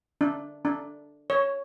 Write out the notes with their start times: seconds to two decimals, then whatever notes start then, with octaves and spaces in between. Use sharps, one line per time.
0.21 D4
0.65 D4
1.30 C#5